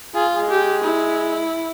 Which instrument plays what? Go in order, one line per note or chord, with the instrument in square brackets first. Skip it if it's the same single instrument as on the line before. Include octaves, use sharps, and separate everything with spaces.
[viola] F4 [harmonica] G#4
[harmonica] G#3 G#4
[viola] G4
E4